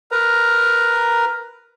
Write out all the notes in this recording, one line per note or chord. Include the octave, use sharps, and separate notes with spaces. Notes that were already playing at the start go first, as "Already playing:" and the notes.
A#4 B4 A#5